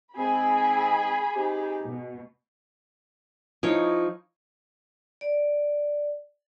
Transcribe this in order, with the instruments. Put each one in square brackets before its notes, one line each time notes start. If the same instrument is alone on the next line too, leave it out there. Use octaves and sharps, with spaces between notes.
[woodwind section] G#2 C4 [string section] G#4 B5
[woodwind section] C4 D#4 G4
[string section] B2
[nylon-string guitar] F3 [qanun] D#4 E4 C#5
[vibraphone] D5